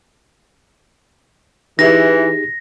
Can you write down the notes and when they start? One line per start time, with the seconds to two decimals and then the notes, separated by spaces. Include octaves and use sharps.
1.79 E3 D#4 G4 G#4 A#6